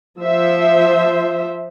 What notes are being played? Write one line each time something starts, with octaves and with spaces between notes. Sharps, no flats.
F3 C5 E5